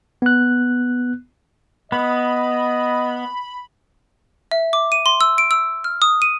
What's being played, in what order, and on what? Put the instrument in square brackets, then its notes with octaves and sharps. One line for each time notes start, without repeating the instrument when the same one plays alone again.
[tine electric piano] B3 F#6
[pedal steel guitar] B3 [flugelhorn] D#5 [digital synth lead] B5
[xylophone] E5
D6
D#7
C6
E6
D7
E6
F6
D#6
D#7